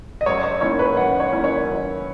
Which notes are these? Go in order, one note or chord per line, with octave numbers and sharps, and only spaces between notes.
D#5
F#2 C#5
C#5
D#3 A#3 C#4 E4 C#5
B4
F#2 F#5
C#5
D#3 A#3 C#4 E4
C#5
F#2